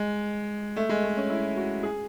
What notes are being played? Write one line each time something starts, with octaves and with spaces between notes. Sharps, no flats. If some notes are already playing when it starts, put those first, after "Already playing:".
Already playing: G#3
A3
G#3
A3
C#4
E4
F#4
G#4